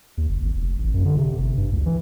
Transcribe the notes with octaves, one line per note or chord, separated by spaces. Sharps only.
D#2
F#1
G#1
F1
A1
F#2
D3
C3
G1
G2
C#2
E3